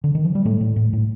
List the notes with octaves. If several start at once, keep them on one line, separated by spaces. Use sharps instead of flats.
D3
D#3
F3
G3
A2 A3
A2
A2
A2